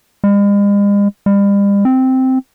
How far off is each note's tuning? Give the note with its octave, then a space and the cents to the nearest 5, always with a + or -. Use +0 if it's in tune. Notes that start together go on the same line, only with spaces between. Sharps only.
G#3 -45
G3 +40
C4 -5